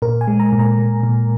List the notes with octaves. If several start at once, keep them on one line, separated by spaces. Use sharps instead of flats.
A#2 A#4
G#5
G#3
A#5
A#2
A#5
A#2
A#2